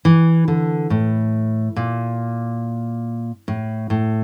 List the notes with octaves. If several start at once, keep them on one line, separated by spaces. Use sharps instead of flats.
E3
D3
A2
A#2
A2
A2